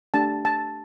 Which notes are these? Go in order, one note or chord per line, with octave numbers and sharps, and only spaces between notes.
A3 D4 G4 A5
A5